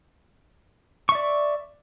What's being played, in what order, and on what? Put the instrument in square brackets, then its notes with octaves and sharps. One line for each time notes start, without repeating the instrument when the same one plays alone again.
[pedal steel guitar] C#6
E5
D5